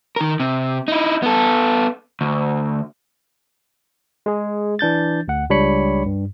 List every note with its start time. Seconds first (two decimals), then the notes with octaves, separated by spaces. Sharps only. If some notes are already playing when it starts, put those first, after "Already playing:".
0.16 D#3 A#4
0.40 C3
0.88 D#4 E4
1.23 B3 A4
2.21 D2
4.26 G#3 G#4
4.79 E3 D4 G6 A6
5.28 D2 F#5
5.50 C#2 G3 D4 C#5 B5 C#7
6.06 G2